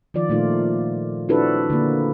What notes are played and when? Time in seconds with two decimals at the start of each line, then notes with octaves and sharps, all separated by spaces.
0.14 D#3 F3 F4 D5
0.29 A#2 A3 D#4 F4
1.29 C4 D4 E4 F#4 A4 B4
1.70 D3 A#3